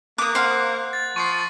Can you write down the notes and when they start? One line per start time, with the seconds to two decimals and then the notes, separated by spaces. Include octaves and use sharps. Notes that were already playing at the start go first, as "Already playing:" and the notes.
0.18 A#3 D6 D#6 F#6
0.35 C5 F5 F#5
0.93 A6
1.16 F3 C#6 C7